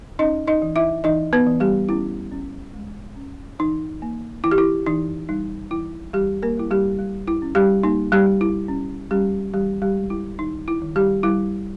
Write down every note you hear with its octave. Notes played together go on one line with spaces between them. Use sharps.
C#4 D#4 D#5
D#4 D#5
E3
E4 E5
E3 D#4 D#5
B3 B4
E3
G3 G4
C#4 E4
C#4
G#3
C#4
E3 D#4
A#3
E3 E4
G4
E4
E3 D#4
G3 D#4
E3 E4
E3 G3 G4
A#3 A#4
G3 E4
G3 G4
G3
E4
C#4
G3 G4
A#3 D#4
G3 G4
G3
E4
C#4
G3 C#4 G4
E3 G3 G4
G3 G4
G#3
E4
D#3 D#4
E4
D#3
G3 G4
G3 E4